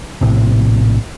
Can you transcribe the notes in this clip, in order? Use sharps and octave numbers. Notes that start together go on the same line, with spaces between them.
A#1 A2 C3